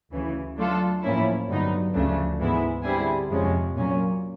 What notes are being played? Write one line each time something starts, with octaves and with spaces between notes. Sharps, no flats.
D2 C#3 E3
F#3 A3 D4 F4 A4
A2 F3 A#3 C#4 E4
G2 D3 F#3 B3 D#4
D2 C#3 F3 A3 D4
G#2 E3 G#3 B3 E4
D3 G3 C4 E4 G#4
F2 C3 F3 G#3 C#4
A#2 F#3 A#3 C#4